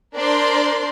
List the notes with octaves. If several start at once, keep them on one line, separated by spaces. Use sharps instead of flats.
D4 A#4 C5 D5 C6